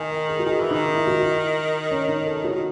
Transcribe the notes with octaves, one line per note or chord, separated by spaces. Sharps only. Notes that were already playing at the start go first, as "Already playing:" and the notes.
Already playing: D#3 G#5
D#5
G#4
F#4
D#3 G#4
E3
D#4
D#3
E4
F#4
E4
C#4
D#4
A4
C#3 F#4
D#3